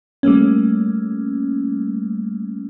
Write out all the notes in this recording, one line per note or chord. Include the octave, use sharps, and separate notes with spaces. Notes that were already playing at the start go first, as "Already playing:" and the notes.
G3 A3 A#3 C#4